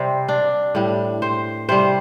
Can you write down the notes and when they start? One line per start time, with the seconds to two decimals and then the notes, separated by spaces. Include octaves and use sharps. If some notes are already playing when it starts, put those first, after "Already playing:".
Already playing: C3 G3 C4
0.28 D4
0.75 A2 G3
1.22 C5
1.69 C3 G3 C5